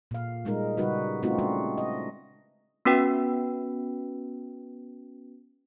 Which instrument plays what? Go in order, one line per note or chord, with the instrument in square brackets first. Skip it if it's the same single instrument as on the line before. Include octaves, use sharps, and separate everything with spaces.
[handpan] A#2 F5
G3 G#3 D#4 A#4
C#3 G3 D#4 F#4 B4
A3 C4 C#4 D#4 F4 F#4
G#3 D4 F#4
D#5
[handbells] B3 C#4 F#4 B4 G5